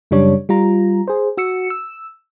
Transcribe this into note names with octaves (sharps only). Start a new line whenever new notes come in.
F#2 C#3 G3 D4 C#5
G3 F4 A#5
G#4 C5
F#4 E6 C#7
E6